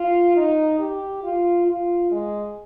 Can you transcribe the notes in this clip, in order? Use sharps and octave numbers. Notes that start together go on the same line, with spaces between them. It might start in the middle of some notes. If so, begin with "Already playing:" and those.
Already playing: F4
D#4
G4
F4
F4
G#3